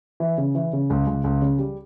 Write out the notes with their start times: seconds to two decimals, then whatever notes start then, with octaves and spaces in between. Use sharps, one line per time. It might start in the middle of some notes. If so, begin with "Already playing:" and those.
0.20 E3
0.38 C#3
0.55 E3
0.73 C#3
0.90 C#2
1.07 C#2
1.24 C#2
1.42 C#3
1.58 G3